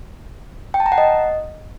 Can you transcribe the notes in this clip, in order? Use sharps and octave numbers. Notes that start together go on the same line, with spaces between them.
G5
A5
A#5
F#5
D#5